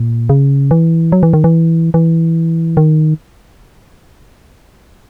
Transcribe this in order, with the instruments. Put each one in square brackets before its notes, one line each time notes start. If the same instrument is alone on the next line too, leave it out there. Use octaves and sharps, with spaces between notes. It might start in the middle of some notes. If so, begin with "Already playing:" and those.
Already playing: [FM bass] A#2
C#3
E3
F#3
E3
D#3
E3
E3
D#3